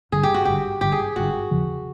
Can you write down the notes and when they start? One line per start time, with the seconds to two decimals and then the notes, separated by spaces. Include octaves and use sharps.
0.12 G#1 G2 D3 G#4
0.23 G4
0.34 F#4
0.45 G#1 G2 D3 G4
0.81 G#1 G2 D3 G4
0.92 G#4
1.16 G#1 G2 D3 F#4
1.51 E2 C#3 F3